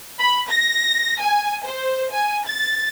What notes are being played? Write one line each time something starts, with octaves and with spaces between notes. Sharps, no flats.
B5
A#6
G#5
C5
G#5
A6